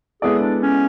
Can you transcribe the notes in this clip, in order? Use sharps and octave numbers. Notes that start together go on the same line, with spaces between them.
G#3 B3 E4 G#4 A4 D5
D4
C#4